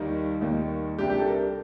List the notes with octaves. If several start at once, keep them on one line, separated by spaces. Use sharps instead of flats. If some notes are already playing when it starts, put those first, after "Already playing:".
Already playing: D#2 D#3 G3 A#3 D#4
D#2 D#3 G3 A#3 D#4
C2 C3 G3 D4 G4
G4
A4
A#4